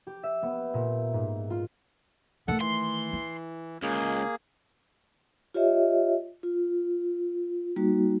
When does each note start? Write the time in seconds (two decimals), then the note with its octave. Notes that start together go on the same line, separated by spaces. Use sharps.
0.07 G4
0.23 E5
0.42 B3
0.74 A#2
1.13 G#2
1.50 F4
2.48 D#3 A3 A4 F#5
2.60 E3 C6
3.13 E4
3.83 C#2 A#3 G#4
5.54 F4 G4 C#5 D#5 E5
6.43 F4
7.76 G3 A#3 D#4 F#4